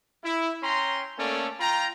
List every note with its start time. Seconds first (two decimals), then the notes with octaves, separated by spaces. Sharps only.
0.24 E4
0.63 C#4 G5 A#5 C6
1.19 A3 A#3 C#4 A4 D5
1.60 F4 G5 A#5